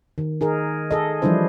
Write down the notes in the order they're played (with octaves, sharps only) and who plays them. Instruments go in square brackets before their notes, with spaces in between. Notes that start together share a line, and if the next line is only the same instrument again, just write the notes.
[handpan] D#3
D#4 G#4 A#4
G#4 A4 D#5
E3 F3 G3 D4 E4 C5